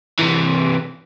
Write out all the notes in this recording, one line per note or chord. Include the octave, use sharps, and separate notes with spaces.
C3 E3